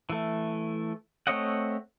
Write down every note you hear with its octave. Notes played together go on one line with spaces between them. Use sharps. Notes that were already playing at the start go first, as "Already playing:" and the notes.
E3 A3
A3 C4 C#5 D#5 F#5